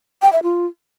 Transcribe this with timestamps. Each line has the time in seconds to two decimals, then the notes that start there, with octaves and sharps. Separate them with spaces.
0.22 G5
0.33 E5
0.43 F4